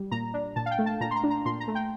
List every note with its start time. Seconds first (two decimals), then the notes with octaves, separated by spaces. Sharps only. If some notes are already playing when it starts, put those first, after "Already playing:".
Already playing: G3
0.11 A#2 A#5
0.34 D4
0.56 A#2 A5
0.66 F5
0.71 G5
0.79 A3
0.86 A5
1.01 A#2 A#5
1.11 C6
1.16 A#5
1.24 D4
1.30 A#5
1.46 A#2 C6
1.60 A#5
1.68 A3
1.75 G5